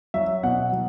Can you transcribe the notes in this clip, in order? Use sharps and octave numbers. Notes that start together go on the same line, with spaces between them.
F#3 E5
B2 F#5
F#3